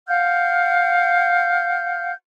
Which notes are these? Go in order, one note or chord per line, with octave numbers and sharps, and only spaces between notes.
F5 F#5 F6 G6